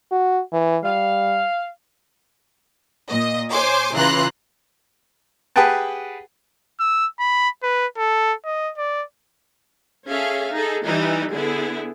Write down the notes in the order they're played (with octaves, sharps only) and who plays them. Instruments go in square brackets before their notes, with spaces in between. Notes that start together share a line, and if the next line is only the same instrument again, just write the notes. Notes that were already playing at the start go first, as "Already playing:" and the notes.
[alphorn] F#4
E3
[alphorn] G3 [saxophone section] F5
[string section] A#2 D#5
C5 C#5 G#5 C6 D6
C#3 E3 F4 A#5 C6 F#6
[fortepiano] G4 G#4 B4 F#5 G5 A5
[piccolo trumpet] E6
B5
B4
A4
D#5
D5
[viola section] C#4 G#4 A4 E5 F5
D#4 G#4 A4
E3 G3 D#4 E4
D3 B3 E4 G#4